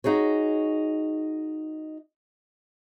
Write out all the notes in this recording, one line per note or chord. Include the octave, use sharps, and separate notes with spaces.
D#4 F#4 G#4 C#5